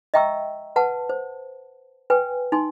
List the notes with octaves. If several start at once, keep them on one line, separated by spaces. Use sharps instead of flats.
D#5 E5 G5 A#5 C#6 E6
B4 F#5 A5
C5
B4 G5 G#5
D#4 G#5 C6